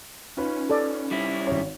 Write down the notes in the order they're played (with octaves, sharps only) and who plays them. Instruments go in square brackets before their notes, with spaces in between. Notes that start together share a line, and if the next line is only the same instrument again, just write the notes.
[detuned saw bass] C#4 [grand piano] D#4 F4 B4
[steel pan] A4 D5
[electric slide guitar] G3 E4
[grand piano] G#1 C#5